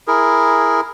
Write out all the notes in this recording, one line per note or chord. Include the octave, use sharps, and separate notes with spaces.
E4 G#4 A#4